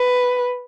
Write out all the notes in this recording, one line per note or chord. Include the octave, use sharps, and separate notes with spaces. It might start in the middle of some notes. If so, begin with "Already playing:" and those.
Already playing: B4